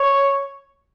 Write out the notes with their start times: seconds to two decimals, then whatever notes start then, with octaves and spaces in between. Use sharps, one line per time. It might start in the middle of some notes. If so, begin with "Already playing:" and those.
Already playing: C#5